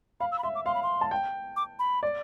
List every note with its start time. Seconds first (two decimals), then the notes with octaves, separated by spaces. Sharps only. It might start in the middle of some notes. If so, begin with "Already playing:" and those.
0.20 F5 B5
0.32 E6
0.39 B5
0.43 E5 C6
0.55 D6
0.66 F5 C6
0.75 B5
0.83 C6
1.01 A5
1.11 G5
1.56 D6
1.79 B5
2.03 D5